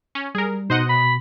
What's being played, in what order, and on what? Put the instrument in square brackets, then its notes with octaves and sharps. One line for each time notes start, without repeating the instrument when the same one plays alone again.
[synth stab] C#4
[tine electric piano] G3 [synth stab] G#4 A#4
[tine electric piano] B2 [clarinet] D#4 [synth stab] C5 D#5 F#5
[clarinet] B5